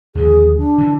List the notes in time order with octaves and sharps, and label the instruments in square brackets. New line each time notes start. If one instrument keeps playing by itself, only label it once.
[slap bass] D#2 D3 F3 [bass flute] G#4
[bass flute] D4
[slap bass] D3 E3